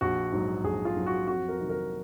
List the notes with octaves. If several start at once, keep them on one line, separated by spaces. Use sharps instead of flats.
A#1 F#4
G#2 F#3
A#1 G#4
F4
G#2 F#3
F#4
F2 F#4
A#4
C3 D#3 F#3
A#4